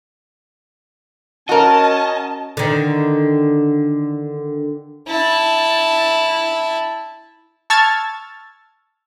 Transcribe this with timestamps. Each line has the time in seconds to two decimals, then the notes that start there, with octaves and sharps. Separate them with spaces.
1.49 C#4 F#4 A#4 D#5 A5
2.57 D3 D#3
5.07 E4 A5
7.70 A5 C#6 E6 F6 G#6 A6